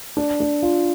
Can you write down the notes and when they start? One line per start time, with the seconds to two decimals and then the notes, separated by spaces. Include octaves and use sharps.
0.17 D4
0.40 D4
0.62 F4